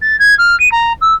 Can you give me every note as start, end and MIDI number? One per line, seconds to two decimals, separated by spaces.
0.02 0.19 93
0.19 0.35 92
0.38 0.58 89
0.60 0.71 99
0.72 0.93 82
1.01 1.14 88